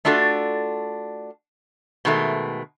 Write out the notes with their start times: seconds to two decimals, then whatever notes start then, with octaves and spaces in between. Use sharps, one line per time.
0.05 A3 D4 F4 F#4 A4
2.05 B2 D#3 G#3 A3